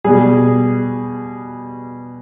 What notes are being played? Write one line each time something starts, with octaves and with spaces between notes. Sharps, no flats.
B2 G3 G#4